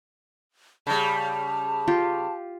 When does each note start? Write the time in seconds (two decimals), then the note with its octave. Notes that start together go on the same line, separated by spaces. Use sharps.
0.87 C#3 G3 A5
1.88 F4 G4